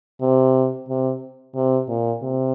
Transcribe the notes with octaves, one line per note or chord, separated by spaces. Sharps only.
C3
C3
C3
A#2
C3